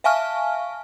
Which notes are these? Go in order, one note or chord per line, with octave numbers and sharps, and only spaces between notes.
E5 F5 G#5 A5 C#6 F6